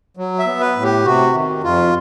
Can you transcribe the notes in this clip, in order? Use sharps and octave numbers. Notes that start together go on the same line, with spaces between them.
F#3
E5
B3
B4
A2
G4
C3 F#4
D#3
F2 F4